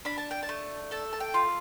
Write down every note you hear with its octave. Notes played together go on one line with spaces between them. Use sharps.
D4 B5
A5
G5
A5
A3
A4 A5
A5
G5
F4